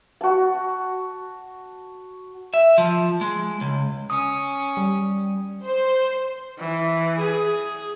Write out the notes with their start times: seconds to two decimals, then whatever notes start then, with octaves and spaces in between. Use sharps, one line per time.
0.21 F#4 A5
2.54 E5
2.78 F3
3.21 G#3
3.61 C#2
4.10 C#4 D#6
4.77 G3
5.65 C5
6.58 E3
7.18 G#4